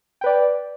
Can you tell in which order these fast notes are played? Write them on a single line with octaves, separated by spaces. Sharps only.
G5 B4 D5